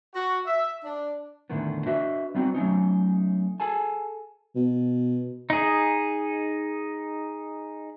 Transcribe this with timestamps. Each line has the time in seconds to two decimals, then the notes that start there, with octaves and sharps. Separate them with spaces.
0.14 F#4
0.47 E5
0.84 D4
1.50 E2 A2 D3 D#3 B3
1.86 D4 F#4 B4 D#5 E5
2.35 G3 B3 C4 D#4 F#4
2.55 F#3 A3 C#4 D#4
3.60 G#4 A4 G#5 A5
4.56 B2
5.50 D#4 G#4